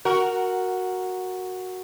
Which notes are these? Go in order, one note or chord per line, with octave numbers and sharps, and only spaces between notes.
F#4 A#4